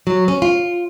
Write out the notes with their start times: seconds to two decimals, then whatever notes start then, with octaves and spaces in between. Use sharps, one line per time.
0.07 F#3
0.28 C#4
0.42 F4